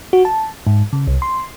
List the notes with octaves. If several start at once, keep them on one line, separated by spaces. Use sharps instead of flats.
F#4
A5
G#2
C#3
C2
C6